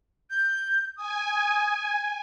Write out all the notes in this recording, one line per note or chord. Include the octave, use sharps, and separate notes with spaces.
G6
G#5 D#6